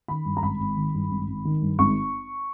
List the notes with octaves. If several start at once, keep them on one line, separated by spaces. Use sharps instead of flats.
D#3 B5
G2
A#5
G#1 B5
G#1
D#3
G2
G#1
G#1
D#3
G2
G#1 C#6